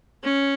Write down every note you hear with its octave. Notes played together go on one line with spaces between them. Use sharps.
C#4